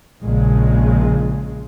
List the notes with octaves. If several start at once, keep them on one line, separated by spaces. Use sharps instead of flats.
A#1 A#2 C#3 G#3